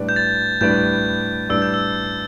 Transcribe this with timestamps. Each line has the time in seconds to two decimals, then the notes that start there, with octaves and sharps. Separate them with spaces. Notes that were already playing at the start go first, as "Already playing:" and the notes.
Already playing: A2 G3 D4 B4 D5
0.09 G6
0.16 A6
0.61 A2 G3 D4 B4 D5 G6
1.49 A2 G3 D4 B4 D5 E6
1.62 G6
1.74 E6